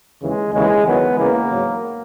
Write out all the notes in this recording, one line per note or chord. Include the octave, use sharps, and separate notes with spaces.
D#2 C#3 E3 G#3
D#2 C#3 E3 G#3
E2 D#3 F#3 B3
E2 C#3 E3 A#3
G#2 F#3